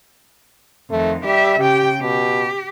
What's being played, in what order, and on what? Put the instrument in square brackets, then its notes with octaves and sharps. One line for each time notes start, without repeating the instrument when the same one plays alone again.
[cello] F2 D#3 [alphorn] A3
[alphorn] G3 [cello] G4 E5
[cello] C#3 G5 [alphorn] G4
[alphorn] B2 [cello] G4